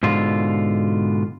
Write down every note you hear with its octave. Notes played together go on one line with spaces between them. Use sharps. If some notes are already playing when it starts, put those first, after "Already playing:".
G#2 B2 D3 F4